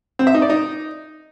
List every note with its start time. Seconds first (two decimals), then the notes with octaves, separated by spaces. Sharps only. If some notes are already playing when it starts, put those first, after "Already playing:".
0.19 C4
0.27 E5
0.34 D#4
0.42 D5
0.50 D#4